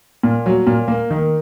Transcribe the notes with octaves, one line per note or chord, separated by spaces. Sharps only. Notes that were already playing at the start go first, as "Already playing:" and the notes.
A#2
F#3
A#2
A#3
D#3